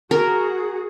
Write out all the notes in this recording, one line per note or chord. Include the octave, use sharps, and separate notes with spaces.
F#4 G#4 A#4